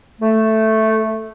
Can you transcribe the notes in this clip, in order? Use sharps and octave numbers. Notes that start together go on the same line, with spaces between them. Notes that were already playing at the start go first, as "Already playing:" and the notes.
A3